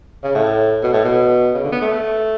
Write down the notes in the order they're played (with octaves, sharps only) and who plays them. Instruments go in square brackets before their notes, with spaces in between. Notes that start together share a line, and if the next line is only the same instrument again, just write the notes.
[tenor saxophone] C#3
A2
B2
A2
B2
C#3
D3
B3
A3